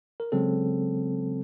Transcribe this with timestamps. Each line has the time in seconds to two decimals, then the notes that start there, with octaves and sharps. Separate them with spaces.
0.20 A#4
0.32 C#3 F#3 G#3 C4 A4